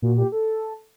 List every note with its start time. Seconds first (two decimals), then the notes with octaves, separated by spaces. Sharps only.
0.02 A#2 F#4
0.17 G4
0.32 A4